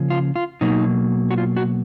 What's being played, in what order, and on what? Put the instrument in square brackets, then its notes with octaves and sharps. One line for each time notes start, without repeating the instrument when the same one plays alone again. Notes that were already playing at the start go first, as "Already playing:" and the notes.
Already playing: [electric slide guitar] C#3 F3 A#3 C#4
F4
F4
B2 F#3 A#3 D#4
F#4
F4
F#4